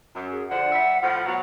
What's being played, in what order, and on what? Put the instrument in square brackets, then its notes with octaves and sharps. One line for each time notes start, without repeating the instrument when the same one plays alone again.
[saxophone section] F#2
[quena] G#4
[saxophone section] D3 F3 D4 [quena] F#5
[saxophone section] G3 E5
A2 F3
B2 F#3